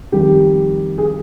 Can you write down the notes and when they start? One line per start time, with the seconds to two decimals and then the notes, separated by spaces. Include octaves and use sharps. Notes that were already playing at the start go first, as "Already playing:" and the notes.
0.12 F2 D#3 G3 G4
0.98 G#4